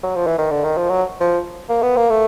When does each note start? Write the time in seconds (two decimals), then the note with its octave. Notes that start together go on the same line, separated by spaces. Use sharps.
0.03 F#3
0.15 F3
0.27 E3
0.38 D#3
0.51 D3
0.64 D#3
0.77 F3
0.89 F#3
1.20 F3
1.69 A#3
1.82 B3
1.96 A#3
2.10 A3